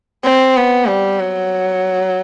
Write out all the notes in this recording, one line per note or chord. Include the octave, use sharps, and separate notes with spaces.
C4
B3
G3
F#3